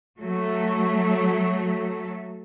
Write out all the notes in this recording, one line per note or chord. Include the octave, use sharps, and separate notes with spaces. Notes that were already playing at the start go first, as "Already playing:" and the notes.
F#3 A3